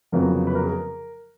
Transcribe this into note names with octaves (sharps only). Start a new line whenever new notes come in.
F1 F2 C#3 F#3 B3 A#4
B4
A#4
G#4
A#4